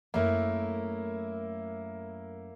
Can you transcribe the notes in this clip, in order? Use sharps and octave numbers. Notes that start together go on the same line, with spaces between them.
F#2 A3 A#3 E4 A#4